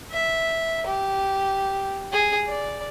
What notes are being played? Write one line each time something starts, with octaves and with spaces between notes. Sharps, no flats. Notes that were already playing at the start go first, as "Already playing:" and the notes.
E5
G4
G#4
D5